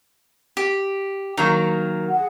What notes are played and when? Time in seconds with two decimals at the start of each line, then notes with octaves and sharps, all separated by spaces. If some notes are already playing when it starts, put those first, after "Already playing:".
0.57 G4
1.37 D#3 F#3 A#3 A#5
2.08 G#4 F#5